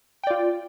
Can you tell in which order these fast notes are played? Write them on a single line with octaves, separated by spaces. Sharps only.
G5 D5 F4